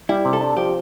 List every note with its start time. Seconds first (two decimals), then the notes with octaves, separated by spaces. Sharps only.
0.09 G3 E4
0.25 C3
0.33 A4
0.41 D4
0.57 F3 G4